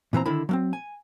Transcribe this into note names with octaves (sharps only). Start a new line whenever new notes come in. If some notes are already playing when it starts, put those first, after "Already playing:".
A#2 E3 C4 A#5
D3 D#3 E4 B5
F#3 A#3 C4
G#5